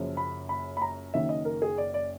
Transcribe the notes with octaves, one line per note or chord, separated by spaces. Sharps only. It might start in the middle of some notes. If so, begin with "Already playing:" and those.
Already playing: F#1 F#2 C#3 F3
B5
B5
B5
A#5
F#1 F#2 D#3 E5
D#5
A#4
G#4
D5
D5